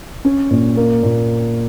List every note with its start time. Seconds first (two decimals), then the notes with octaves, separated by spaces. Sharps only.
0.25 C#4
0.51 A#2
0.77 A#3
1.03 A#2